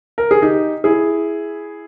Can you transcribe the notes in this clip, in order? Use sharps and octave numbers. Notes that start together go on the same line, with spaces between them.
A#4
G#4
D#4 G4
E4 G#4